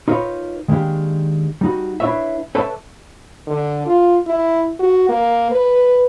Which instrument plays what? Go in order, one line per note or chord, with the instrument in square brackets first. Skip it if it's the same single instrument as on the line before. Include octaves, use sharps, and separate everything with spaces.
[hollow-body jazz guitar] D#4 F4 A#4 B4 C#5
D#3 G#3 A#3 D4 G4
G3 D#4 F#4
D4 E4 G4 B4 C#5 E5
A4 B4 C#5 D5 E5 A5
[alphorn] D3
F4
E4
F#4
A#3
B4